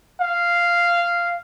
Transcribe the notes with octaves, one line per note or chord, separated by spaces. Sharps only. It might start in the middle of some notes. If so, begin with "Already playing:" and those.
F5